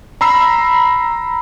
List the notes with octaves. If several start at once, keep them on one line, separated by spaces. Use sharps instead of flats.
A#5 B5 E6 C7